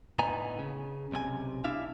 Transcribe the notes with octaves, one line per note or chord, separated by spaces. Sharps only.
A2 D3 B3 D#4 G#5 A#5
C#3
B1 C3 G#4 G#5
B2 D4 E4 E5 F5